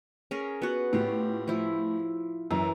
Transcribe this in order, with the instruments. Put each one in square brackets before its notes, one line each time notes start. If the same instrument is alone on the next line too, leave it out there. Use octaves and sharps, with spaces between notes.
[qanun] C#4 G#4 A#4
B3 F#4
[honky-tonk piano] A2 [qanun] F4 G4
[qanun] F3 E4
[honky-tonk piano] F#2 [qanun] E3